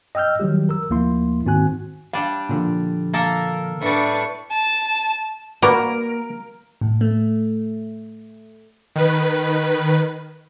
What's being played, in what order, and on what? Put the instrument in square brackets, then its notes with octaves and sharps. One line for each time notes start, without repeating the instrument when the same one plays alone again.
[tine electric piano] D#5 G5 E6 F6 G6
D#3 F#3 G3 G4
A#4 E6
D2 F3 A#3 E4 C6
G#2 D#3 C4 F#4 G#5 F#6
[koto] G3 D4 [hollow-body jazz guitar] F5
[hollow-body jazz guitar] A#2 D3 F3
[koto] A#3 A4 A#4
[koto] A2 G3 [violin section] D4 B4 C#6
[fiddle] A5
[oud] A#3 [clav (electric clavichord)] F#4 B4 D5 [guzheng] A#4
[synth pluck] A2
A3
[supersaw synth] D#3 B4